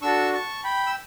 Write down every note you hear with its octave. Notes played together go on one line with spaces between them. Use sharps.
D4 F#4 A4 C#6 E6
A5 C#6
G5 B5
E6